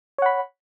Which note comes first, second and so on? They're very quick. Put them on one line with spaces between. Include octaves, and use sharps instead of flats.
C#5 F#5 B5